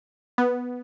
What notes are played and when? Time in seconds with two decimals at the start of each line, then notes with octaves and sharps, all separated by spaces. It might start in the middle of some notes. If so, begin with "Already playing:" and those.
0.38 B3